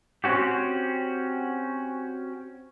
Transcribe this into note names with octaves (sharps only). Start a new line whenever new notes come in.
C4 C#4 F#4 G4